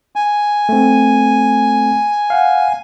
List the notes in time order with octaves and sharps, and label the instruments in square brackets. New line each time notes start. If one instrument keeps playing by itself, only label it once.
[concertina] G#5
[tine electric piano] A3 C4
F5 F#5